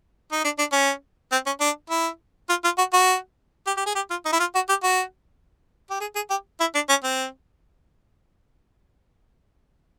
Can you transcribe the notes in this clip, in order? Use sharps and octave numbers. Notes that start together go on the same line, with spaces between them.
D#4
D4
D4
C#4
C4
C#4
D4
E4
F4
F4
F#4
F#4
G4
G4
G#4
G4
F4
D#4
E4
F4
F#4
G4
F#4
G4
G#4
G#4
G4
E4
D4
C#4
C4